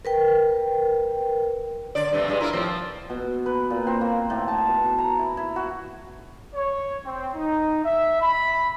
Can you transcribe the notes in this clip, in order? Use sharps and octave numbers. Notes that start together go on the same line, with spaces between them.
A#4 B4 G5
D3 D5
G2 C3 A3
G2 G#3
E4 F4 A#4
A2 F3 C4
F3
B2
B4
A#2
C4
A#3
A2
A5
B2
A#5
E4
E4
F#4
C#5
C4
D#4
E5
B5